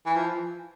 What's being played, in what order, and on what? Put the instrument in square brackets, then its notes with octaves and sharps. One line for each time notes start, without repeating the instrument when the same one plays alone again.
[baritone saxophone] E3
F3